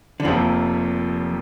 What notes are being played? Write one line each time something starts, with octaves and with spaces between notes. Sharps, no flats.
D3
F1 F2 C3 F3 A#3